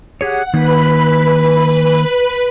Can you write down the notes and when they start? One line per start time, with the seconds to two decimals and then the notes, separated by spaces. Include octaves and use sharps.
0.21 G4 G#4 C#5 F#5
0.54 D#3 A#3 D#4 B4 B5